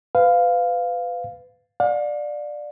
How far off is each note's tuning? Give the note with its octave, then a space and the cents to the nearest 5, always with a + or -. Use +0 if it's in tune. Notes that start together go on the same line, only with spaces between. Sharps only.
B4 +30 F5 +0
D5 +10 F5 +40